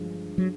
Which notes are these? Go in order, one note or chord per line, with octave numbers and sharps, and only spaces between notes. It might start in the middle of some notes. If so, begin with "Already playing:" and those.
Already playing: G2 D3 F3 G#3
F#3